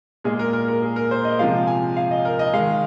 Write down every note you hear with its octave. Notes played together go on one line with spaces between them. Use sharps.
A#2 G#3 G#4
A#4
A#4
A#4
G#4
A#4
C5
D#5
C3 F3 G#3 F5
G#5
F5
D#5
A#4
D#5
D#3 G#3 F5